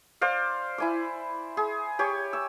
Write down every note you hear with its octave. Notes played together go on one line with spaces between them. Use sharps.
C5 D5 F5
E4 G#5 D6
G#4
G4 C#5 G#5
E6